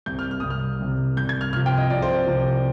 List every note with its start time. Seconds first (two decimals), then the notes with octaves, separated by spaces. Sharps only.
0.06 C2 C3 G3 G6
0.19 F6
0.31 F6
0.40 C2 C3 G3 D#6
0.50 F6
0.80 C2 C3 G3
1.17 C2 C3 G3 G6
1.29 G#6
1.41 F6
1.53 C2 C3 F3 F6
1.66 G5
1.77 D#5
1.90 C2 C3 F3 D5
2.02 C5
2.14 D5
2.27 C2 C3 F3